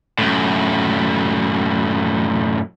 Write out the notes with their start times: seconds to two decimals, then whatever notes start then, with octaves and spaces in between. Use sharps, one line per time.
0.19 F#2 A2